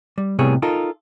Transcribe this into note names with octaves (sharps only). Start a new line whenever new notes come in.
G3
A2 C3 G3 B3 G#4 C#5
D#4 F4 A4 A#4